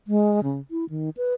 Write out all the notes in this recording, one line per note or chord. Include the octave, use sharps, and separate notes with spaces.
G#3
C#3
E4
D#3
B4